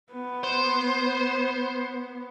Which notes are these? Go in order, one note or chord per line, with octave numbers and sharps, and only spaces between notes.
B3
C5